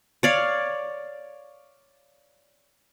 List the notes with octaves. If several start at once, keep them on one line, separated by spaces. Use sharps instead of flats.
C#5 D5 F5